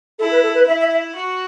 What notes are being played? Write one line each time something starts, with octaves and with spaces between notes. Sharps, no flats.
E4 A4
B4
A4
B4
E4 E5
E5
E5
F#4